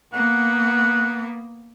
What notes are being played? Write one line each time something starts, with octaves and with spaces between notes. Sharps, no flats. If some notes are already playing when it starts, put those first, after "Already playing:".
A#3 B3 F#5